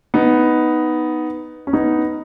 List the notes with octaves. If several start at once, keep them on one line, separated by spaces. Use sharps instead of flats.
B3 D#4
C#4
B3 D#4